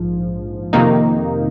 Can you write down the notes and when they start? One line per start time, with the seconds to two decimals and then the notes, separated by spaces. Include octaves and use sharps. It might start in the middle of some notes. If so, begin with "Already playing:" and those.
Already playing: A#1 G#2 F3
0.73 F2 C3 D#3 A#3 D#4